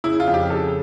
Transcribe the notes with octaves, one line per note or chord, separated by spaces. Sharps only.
C#3 E4
F4
F2
G4
C#3 A4